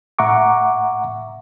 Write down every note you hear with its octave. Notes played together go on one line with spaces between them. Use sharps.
A2 E5 F#5 A#5 C#6 D6